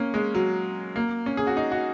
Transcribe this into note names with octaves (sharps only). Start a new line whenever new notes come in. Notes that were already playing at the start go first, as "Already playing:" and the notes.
Already playing: A#3 C#4
G#3
F#3
A#3
C#4
G#4
F#4
D#4
F#4